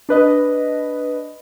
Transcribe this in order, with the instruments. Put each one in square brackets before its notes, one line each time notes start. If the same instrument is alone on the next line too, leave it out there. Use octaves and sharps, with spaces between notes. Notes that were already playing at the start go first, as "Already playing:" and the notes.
[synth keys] D4 B4 D#5